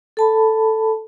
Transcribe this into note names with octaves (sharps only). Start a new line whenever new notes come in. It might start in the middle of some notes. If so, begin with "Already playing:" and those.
A4 A5 B5